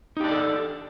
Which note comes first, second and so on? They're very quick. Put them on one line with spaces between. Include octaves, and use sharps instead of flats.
D#4 G4 D4 D5 A4